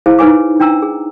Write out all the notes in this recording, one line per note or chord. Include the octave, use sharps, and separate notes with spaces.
E4 G#4 C5 F5 A5
D#4 B4 C#5 G#5 D6
D4 G5 A#5 E6
G#4